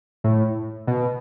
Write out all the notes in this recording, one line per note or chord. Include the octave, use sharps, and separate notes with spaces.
A2
B2